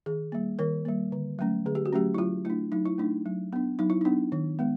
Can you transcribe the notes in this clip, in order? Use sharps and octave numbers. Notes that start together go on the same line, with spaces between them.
D#3 G#4
G3 A#3
D#3 A#4
G3 A#3
D3
F#3 A3 C#4
D3 G#4
G4
F#4
F#3 A3 C#4 G4
E4
F#3 F4
A3 D4 E4
F#3 D#4
E4
A3 D4 D#4
F#3
B3 D4
F#3 D#4
E4
B3 D4 D#4
D#3
G#3 B3